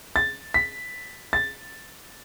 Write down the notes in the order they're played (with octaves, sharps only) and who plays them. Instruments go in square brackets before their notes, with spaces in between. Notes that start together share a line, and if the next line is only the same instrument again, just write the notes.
[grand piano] A6
B6
A6